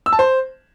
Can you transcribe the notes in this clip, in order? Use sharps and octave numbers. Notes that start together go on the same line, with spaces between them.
E6
A5
C5